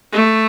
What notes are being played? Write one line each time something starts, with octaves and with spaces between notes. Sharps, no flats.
A3